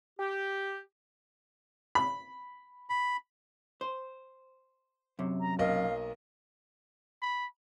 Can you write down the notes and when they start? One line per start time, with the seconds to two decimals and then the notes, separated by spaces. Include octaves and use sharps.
0.19 G4
1.95 B5
2.90 B5
3.81 C5
5.19 F#2 C3
5.41 A#5
5.59 B1 A#3 D#5 F5
7.22 B5